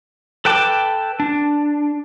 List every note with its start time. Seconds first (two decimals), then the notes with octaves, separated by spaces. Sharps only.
0.45 A4 B4 G5 A5 D6
1.20 D4